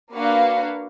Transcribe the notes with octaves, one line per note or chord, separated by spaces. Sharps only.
A#3 D4 F#4 B4 F5 F#5